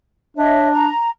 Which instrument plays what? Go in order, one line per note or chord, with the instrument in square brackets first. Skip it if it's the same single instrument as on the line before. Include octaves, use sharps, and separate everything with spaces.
[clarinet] D4 [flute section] C#5 D#5 E5
[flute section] A#5